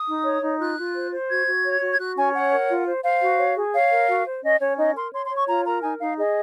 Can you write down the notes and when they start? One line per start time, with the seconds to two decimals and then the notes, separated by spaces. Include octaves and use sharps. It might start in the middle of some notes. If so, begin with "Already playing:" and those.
Already playing: D#6
0.08 D#4
0.25 C#5
0.43 D#4
0.60 F4 F#6
0.78 F4
0.95 C5
1.12 C5
1.29 F#4 G#6
1.47 F#4
1.65 C#5
1.81 F#4
1.92 G#6
1.99 F#4 F#6
2.16 C#4 G#5
2.34 C#5 F#5
2.52 A#4
2.69 F4
2.86 C5
3.04 C5 F5
3.21 F#4
3.38 C#5
3.56 G#4
3.74 C#5 F5
3.91 A#4
4.08 F#4
4.25 C5
4.43 C#4 D#5
4.60 C#4 C#5
4.77 D#4 D#5
4.95 A#4 C6
5.12 C#5 C6
5.25 C6
5.30 C#5
5.35 C#6
5.47 F4 A#5
5.65 A#4 A#5
5.82 D#4 G#5
5.99 D#4 F5
6.17 G#4 D#5